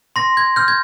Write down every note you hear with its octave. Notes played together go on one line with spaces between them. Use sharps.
C6 A#6
G#6
F6 G6
G#6